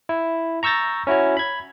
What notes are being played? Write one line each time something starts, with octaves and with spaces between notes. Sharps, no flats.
E4
A#5 C#6 E6 G6 A6 A#6
C#4 E4 F#4 C#5
B5 G#6